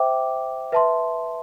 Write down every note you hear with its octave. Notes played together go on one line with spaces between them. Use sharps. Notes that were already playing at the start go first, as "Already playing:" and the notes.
Already playing: C5 E5 G5 D6
B4 E5 A5 C6